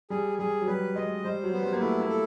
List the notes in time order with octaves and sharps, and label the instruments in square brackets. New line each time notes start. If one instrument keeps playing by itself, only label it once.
[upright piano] G3 [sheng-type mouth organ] G#4
[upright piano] G3 [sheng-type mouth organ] G#4
[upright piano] F#3
[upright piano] G3 [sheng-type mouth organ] B4
[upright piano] G#3 [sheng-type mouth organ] D#5
[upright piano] G3 [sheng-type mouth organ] C5
[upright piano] F#3
[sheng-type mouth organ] B3
[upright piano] G3
A#3
[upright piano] A3 [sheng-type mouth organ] E4
[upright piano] A#3
[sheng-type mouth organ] A4